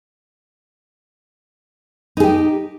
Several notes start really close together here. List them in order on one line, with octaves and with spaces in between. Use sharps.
D#4 G#4 G4